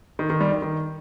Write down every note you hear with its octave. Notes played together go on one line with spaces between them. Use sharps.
D#3
D#3
G3
D#3
D#3